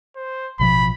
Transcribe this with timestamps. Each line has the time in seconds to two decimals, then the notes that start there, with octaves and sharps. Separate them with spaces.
0.16 C5
0.59 A1 B2 F3 B5